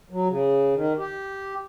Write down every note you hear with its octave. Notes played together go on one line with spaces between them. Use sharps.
F#3
C#3
D#3
G4